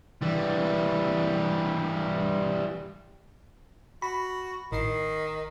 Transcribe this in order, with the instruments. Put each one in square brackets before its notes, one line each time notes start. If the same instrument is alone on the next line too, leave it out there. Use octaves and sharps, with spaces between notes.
[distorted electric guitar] E3 G3
[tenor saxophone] F#4 [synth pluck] B5
[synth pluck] A1 C7 [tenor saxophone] D#3